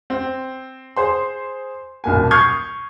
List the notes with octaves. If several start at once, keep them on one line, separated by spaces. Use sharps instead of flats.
C4
G#4 C5 C6
D#1 B1 A#3 G#5
C#6 D#6 F6 G6 G#6 C7